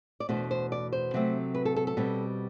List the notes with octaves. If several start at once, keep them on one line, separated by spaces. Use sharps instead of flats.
D5
E2 B2 A3 D4 C5
C5
D5
C5
C3 F#3 A3 C4
B4
A4
A4
A4
B2 G3 C4